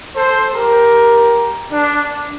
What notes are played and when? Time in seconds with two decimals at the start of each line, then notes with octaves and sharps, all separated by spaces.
0.17 A4 C5
0.55 G4 A#4
1.72 D4